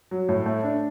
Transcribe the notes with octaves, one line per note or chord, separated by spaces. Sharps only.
F#3
A2
A3
D4